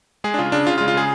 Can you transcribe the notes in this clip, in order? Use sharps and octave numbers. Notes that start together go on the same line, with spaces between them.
G#3 G#4
D4
C#3 F4
C#3 D4
C#3 F4
F4
G#3
F4
C#3 G#4